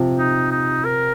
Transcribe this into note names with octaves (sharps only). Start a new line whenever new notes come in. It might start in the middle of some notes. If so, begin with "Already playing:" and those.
Already playing: C3 F3
D#4
D#4
A#4